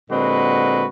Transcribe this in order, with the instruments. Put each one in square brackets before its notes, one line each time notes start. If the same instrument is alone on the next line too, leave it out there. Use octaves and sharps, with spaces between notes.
[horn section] A#2 D3 G#3 C4 F#4 B4